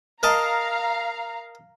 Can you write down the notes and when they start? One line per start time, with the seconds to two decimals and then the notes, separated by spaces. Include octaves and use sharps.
0.23 A#4 D#5 F5 A5 A#5